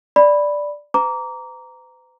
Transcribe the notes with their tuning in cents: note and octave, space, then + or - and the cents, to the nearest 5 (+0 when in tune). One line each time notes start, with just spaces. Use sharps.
D5 +0 B5 +0
B4 +45 A#5 +0 D6 -25